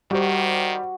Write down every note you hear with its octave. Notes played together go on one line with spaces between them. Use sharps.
D#3 G3 F#4 G4 C5